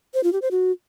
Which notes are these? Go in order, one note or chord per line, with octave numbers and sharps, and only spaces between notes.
C5
F4
G4
C5
F#4